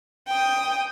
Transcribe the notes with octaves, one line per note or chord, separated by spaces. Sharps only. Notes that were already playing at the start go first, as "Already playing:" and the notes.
G5 D#6